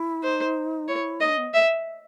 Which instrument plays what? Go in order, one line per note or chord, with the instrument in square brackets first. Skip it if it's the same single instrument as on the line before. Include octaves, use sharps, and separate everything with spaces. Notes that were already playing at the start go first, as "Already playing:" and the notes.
Already playing: [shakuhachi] E4
[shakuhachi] D#4 [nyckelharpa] C5
[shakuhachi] E4 [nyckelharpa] C#5
[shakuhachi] D#4 [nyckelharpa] D#5
[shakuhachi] D4
B3
[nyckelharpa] E5